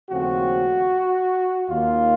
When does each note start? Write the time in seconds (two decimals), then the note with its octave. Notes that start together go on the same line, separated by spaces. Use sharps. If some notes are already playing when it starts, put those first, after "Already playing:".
0.10 D#2 C#3 F3 A3 C4 F#4
1.68 D#2 D#3 A#3 F4